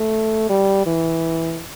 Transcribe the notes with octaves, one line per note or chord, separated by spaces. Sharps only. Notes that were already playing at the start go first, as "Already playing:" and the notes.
Already playing: A3
G3
E3